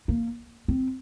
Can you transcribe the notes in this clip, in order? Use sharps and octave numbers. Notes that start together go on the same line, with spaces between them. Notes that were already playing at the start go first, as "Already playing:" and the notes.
A#3
C4